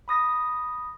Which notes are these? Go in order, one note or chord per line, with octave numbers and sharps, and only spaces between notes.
B5 D#6 A#6